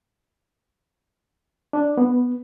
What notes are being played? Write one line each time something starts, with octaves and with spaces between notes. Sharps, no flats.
D4
B3